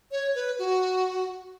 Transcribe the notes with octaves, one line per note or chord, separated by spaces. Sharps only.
C#5
B4
F#4